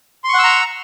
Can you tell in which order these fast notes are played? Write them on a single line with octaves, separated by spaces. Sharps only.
C6 C#6 F#5 E6 A#5